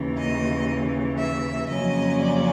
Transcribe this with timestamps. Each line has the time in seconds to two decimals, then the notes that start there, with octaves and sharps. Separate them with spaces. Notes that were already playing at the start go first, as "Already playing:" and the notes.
Already playing: D#2 C#3 E3
0.16 D#5
1.18 E5
1.69 F2 C#3 F#3 A#3 C#4 D#5
2.20 D5